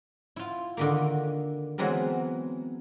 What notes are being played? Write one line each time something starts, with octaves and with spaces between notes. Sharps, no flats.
E4 F4
D3 D#3 A#3
E3 F#3 G#3 B3 C4 A#4